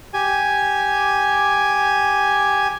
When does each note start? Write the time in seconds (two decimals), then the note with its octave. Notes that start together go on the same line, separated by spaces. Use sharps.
0.14 G4 G#5